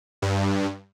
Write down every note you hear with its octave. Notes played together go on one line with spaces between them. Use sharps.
G2